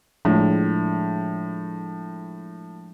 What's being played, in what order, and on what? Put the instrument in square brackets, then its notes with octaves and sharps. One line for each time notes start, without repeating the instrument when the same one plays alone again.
[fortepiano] A2 [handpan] F3 G#3 D4